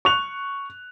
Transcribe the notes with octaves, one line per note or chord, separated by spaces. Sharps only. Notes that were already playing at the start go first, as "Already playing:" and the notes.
C#6 F#6 F7